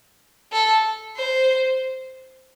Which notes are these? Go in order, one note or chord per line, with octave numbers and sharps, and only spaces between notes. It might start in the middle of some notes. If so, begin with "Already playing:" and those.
A4
C5